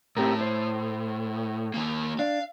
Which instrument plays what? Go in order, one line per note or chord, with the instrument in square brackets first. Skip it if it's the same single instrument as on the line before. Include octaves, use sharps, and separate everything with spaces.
[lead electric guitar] A2 [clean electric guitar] C4 G4 A#4
[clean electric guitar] C5
[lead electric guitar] D#3 A#3
[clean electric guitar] D4 [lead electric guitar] F5